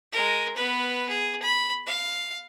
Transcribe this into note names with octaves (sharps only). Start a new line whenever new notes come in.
G#3 A#4
B3 B4
G#4
B5
F5